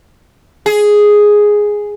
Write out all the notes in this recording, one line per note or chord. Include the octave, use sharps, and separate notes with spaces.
G#4